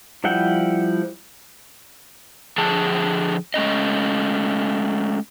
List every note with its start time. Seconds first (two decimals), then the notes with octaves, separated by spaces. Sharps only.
0.24 F3 G3 E4 F#5 G5
2.58 D3 F3 G#4 A5
3.54 G#3 A3 C#4 D#5